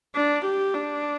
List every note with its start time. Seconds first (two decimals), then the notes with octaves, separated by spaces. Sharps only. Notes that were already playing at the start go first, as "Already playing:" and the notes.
0.15 D4
0.45 G4
0.74 D4